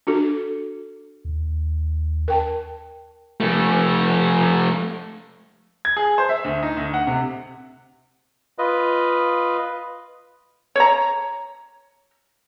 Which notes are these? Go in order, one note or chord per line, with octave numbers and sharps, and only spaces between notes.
D4 F#4 A4
D#2
A#4 G5 A5
F2 A3
G#6
G#4
C5
E5
D2
D#4
D2
F#5
C3
F4 B4 D#5
C#5 A#5